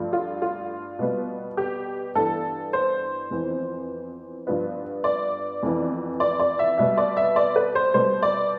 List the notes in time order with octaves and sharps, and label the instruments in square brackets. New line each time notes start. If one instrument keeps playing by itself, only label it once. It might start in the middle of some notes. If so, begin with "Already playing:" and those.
Already playing: [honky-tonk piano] G2 F3 A3
F4
F4
B2 G3 B3
G4
G2 E3 B3 A4
C5
F2 E3 B3
G2 F3 B3
D5
F2 E3 B3
D5
D5
E5
B2 G3 B3 E5
D5
E5
D5
B4
C5
B2 G3 B3 C5
D5